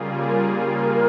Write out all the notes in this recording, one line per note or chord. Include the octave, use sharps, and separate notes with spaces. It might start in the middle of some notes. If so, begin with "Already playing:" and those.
Already playing: C#3 G3 A#3 F4 G#4
A#4